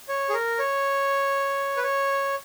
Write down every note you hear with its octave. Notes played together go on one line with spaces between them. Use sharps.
C#5
G#4
A#4
C#5
B4
C#5